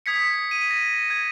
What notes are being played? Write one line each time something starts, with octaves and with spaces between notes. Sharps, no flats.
D#6 G#6 B6 C#7
D#7
A#6
G#6